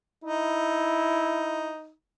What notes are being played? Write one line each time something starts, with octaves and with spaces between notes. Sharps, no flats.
D#4 E4